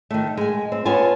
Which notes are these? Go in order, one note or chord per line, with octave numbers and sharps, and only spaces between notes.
D#3 A3
G#3 G#5
C4
B3 C#4 F4 G#5 A5